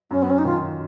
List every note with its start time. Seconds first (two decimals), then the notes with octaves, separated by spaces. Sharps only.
0.11 F#2 C#4
0.22 B3
0.30 C#4
0.38 D#4
0.45 D#3 F4